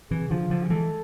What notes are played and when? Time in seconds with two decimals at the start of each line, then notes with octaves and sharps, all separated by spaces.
0.10 C3 E3 G#4
0.31 D3 F3 F4
0.50 D3 F3
0.64 G#4
0.70 E3 G#3 A4